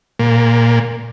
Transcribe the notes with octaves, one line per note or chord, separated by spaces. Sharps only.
A#2